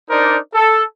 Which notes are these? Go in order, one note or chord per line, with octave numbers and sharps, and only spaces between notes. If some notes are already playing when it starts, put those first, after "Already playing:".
D4 D#4 A#4 C5 D5
A4